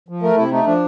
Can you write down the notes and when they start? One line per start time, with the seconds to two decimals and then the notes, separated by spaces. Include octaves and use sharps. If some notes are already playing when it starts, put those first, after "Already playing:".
0.09 F3
0.22 A3 A#4
0.37 C3 E4
0.51 A3 D#4
0.66 F3 D4